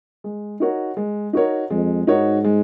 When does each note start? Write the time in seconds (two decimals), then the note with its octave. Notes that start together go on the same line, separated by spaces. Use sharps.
0.24 G#3
0.60 D#4 F#4 A#4 C#5
0.97 G#3
1.33 D#4 F#4 A#4 C#5
1.70 F2 G#3
2.07 G#2 D#4 F#4 A#4 C#5
2.44 G#3